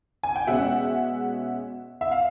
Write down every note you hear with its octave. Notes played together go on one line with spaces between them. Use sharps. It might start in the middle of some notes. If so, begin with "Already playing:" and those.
G#5
G5
B2 G#3 C#4 E5 F#5
E5
F5